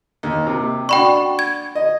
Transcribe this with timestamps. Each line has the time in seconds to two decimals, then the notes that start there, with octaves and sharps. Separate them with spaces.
0.23 D#2
0.47 C3
0.89 D4 F#4 D5 G5 B5 C#6
1.39 G#6
1.75 D#5